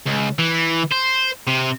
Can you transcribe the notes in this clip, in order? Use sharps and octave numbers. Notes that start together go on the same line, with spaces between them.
C#2
E3
C5
C3